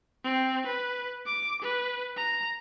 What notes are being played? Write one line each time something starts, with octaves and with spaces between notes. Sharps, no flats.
C4
B4
D6
B4
A#5